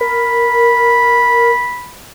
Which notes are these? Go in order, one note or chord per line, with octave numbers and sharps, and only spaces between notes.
A#4 B5